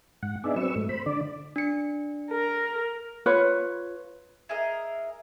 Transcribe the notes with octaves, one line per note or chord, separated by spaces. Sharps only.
G#2 F#5
B3 D4 D#4 G#4 D5 E5
F#3 C4 B4 C#6 E6
G#2 A3
C5 B5
D3 D5
D4 C#7
A#4
F4 B4 C#5
E4 G#4 A#4 D#5